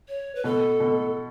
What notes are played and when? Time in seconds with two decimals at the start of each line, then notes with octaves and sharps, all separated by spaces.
0.09 C#5
0.35 B4
0.44 B2 A4
0.80 B2